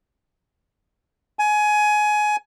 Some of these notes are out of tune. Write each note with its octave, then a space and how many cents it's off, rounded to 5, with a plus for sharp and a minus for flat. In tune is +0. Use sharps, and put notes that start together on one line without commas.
G#5 +20